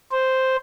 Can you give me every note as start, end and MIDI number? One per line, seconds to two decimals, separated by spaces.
0.12 0.56 72